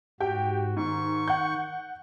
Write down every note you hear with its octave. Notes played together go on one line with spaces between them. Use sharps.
G#2 F#4 G4 G5
G#2 D#3 C#6
F#5 G6